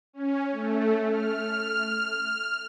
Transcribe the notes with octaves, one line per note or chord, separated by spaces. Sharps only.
C#4
A3
F6